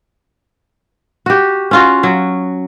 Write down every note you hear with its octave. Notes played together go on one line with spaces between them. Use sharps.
F#4 G4
C#4 F4 F#4
F#3